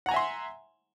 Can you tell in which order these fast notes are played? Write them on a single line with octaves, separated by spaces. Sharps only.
F#5 A#5 G#5 E5 C6